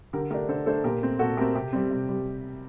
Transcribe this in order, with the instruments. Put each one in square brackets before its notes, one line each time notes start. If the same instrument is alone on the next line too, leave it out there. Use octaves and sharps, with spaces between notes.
[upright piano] D3 G4 A#4
A3 G4 A#4
D4
D3 A4 C5
A3 D4 A4 C5
A#2 G4 A#4
A3 C4
A#2 F#4 A4
A3 G4 A#4
C4
C3 G4
G3 C4
C3
G3